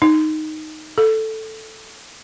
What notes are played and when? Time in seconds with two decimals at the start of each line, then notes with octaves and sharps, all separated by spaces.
0.02 D#4
0.98 A4